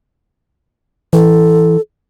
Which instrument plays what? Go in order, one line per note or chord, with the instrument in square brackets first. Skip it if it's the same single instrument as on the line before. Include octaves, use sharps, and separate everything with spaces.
[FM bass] E3 [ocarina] A4